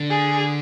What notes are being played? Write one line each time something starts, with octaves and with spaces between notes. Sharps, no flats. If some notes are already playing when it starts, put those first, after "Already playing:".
Already playing: D3
G#4